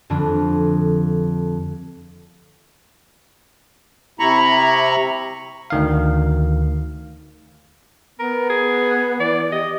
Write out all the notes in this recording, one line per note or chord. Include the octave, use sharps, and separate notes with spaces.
F2 D3 F3 G3 D4
C3 E4 A#5 B5 C#6
D2 D#3 F5
B3 A#4
G#4
E3 D5
G4 D#5